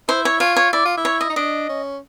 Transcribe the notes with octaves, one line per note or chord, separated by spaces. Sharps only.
E4 C5
C#5
F4 C#5
C#5
E4 D5
F4
E4
C#5
D#5
D#4
D4 D#5
C#4